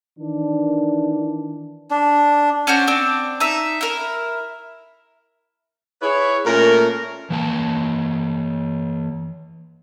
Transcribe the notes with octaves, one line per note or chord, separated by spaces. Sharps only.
D#3 E3 D4
D4
C#4 D4 F#4 C5
C4 D4
D#4 E5
E4 A#4
E4 G#4 B4 C#5
A#2 A3 A#3 C#4 A#4
E3 A#3 A5